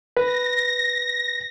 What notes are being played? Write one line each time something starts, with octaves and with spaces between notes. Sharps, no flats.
B4 A#6